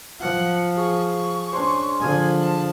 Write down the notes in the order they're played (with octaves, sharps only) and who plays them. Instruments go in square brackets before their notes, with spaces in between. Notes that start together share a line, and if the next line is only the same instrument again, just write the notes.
[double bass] F3 [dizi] F#5
[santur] G#4 [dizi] C#6
[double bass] C#4 [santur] D4 C5
[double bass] D3 F3 [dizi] G#5
[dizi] A5